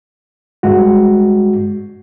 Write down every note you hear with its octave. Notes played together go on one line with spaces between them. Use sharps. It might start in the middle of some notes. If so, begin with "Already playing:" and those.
G2 G#3 F#4